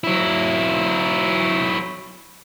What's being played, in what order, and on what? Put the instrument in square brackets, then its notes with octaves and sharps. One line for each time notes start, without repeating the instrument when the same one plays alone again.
[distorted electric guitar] F#3 E4